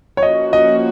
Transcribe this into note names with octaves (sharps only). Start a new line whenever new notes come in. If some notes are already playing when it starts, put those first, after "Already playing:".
C#5
F3 A#3 C#4 F#4 D#5
D#5